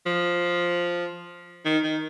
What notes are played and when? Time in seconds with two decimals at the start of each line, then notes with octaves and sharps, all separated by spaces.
0.06 F3
1.65 D#3
1.84 D#3